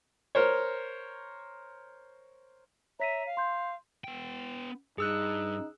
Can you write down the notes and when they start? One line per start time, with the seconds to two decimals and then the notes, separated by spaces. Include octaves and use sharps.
0.35 A#4 C5 C#5
3.00 C#5 E5 A#5 B6 D#7
3.26 F5
3.37 C6 G6
4.04 B3 G5
4.98 G2 D#4 G#4 E6 F#6